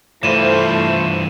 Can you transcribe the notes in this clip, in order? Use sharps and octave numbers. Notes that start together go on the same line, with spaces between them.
G2 E3 A3 E4 F4 C5 D#7 E7